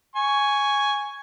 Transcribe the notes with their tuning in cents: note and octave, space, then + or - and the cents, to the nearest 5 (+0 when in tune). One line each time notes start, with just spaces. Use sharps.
G#5 +0 C#6 +10